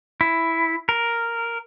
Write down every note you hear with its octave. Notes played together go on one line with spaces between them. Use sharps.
E4
A#4